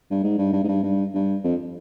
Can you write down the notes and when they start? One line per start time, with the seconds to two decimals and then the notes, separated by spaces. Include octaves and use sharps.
0.11 G2
0.23 G#2
0.38 G2
0.53 G2
0.63 G#2
0.68 G2
0.83 G2
1.14 G2
1.44 F2